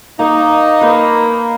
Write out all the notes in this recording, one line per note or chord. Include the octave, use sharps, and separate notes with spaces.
A#3 D#4
A#3 B4